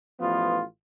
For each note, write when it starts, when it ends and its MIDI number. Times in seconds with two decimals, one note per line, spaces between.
0.18 0.61 33
0.18 0.61 53
0.18 0.61 59
0.18 0.61 65